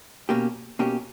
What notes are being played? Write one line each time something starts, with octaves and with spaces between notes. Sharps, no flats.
B2 A#3 C#4 G4
B2 A#3 C#4 G4